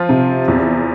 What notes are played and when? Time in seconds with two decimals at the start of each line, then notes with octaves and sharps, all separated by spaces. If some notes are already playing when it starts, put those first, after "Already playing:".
Already playing: F3 F4
0.09 C3
0.48 E2